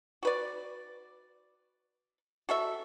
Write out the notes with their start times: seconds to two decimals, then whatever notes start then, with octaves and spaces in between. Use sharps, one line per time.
0.23 F#4 B4 D5
2.49 F#4 A4 E5